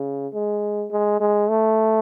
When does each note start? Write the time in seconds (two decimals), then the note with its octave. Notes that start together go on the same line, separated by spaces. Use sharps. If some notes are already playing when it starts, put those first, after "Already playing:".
Already playing: C#3
0.33 G#3
0.91 G#3
1.20 G#3
1.49 A3